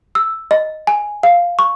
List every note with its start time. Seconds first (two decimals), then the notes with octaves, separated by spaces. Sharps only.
0.15 E6
0.51 D#5
0.87 G#5
1.23 F5
1.59 C#6